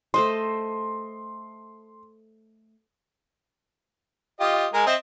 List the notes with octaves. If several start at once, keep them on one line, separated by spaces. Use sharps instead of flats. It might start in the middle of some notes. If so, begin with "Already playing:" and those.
A3 C5 D#5 C6
F4 G4 D#5
G#3 G#4 A#4
C4 D#5 E5